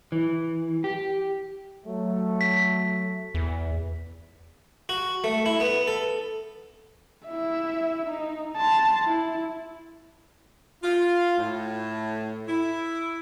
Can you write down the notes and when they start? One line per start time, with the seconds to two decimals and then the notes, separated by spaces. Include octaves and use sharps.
0.12 E3
0.84 G4
1.85 F#3 A3
2.41 B6
3.34 E2
4.89 F#4
5.24 A3
5.46 E4
5.60 B3
5.88 A4
7.27 E4 E5
8.05 D#4
8.57 A5 C6
9.06 E4
10.83 F4
11.38 A2
12.47 E4